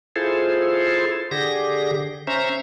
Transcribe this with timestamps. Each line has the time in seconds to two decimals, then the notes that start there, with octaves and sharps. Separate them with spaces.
0.16 E4 F4 G#4 A4 C5
1.31 D3 G4 G#4 A#6
2.27 C#4 C5 E5 A#5